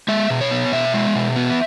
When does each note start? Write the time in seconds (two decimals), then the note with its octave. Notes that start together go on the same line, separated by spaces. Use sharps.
0.08 G#3 E5
0.30 B2
0.41 C#5
0.51 B3
0.72 B2 E5
0.94 G#3
1.15 B2
1.36 B3